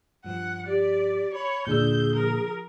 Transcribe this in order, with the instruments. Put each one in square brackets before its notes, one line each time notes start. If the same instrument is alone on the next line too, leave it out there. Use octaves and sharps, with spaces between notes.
[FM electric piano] G2 F3 [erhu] F#5
[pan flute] G4 [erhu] D5
[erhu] C#5 [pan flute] B5
[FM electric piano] D#2 D4 E6 [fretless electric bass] A#2 D3 [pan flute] G#4 [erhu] G6
[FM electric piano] F3 [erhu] A#4